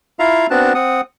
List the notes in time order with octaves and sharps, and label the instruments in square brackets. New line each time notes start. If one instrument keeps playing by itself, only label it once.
[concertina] E4 F4 E5 F5 A#5
B3 C4 D4 F#4 A5
C4 F#5 D#6